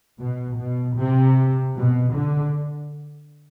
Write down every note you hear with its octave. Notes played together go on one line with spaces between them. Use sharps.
B2
B2
C3
B2
D3